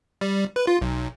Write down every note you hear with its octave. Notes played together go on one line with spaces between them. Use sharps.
G3
B4
F4
B1